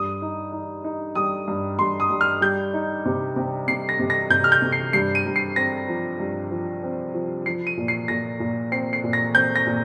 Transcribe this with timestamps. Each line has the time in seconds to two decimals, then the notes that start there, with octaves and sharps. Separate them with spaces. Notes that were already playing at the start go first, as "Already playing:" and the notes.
Already playing: G2 D#6
0.22 D#4
0.52 D#4
0.84 D#4
1.15 G3 D#6
1.48 G2
1.79 G2 C6
2.00 D#6
2.10 G2
2.21 F6
2.41 G3 G6
2.74 D#4
3.05 C3
3.36 C3
3.68 C3 C7
3.89 A#6
3.99 C3
4.10 A#6
4.30 C3 G6
4.44 F6
4.52 G6
4.62 C3
4.72 C7
4.93 G2 C7
5.15 D#7
5.26 G2
5.36 C7
5.56 C4 A#6
5.88 F3
6.20 G2
6.51 F3
6.83 C4
7.14 F3
7.46 F3 C7
7.67 D#7
7.77 A#2
7.88 C7
8.08 A#2 A#6
8.40 A#2
8.72 C4 C7
8.93 C7
9.04 A#2
9.13 A#6
9.35 C4 G6
9.56 A#6
9.66 A#2